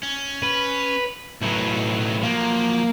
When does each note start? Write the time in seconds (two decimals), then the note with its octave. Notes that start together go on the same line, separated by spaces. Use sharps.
0.03 C#4
0.43 B4
1.42 B1 A2 F#3 B3
2.23 F3 F#3 A#3